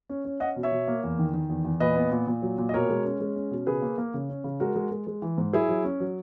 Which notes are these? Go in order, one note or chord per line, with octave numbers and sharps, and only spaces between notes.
C#4
C#4
C#4 D#5 F#5
B2
C#5 E5
B2
A#3
E2
D#3
D#3
E2
E2
A#2 B4 D#5
B3
A#2
A#2
F#3
A#2
D#5
B2 A#4 C#5
G#3
C#4
G#3
C#4
B2
C#3 G#4 B4
A#3
A#3
C#3
C#4
C#3
G#3 F#4 A#4
G#3
G#3
G#3
E3
G#2
F#3 E4 G#4
F#3
C#4
F#3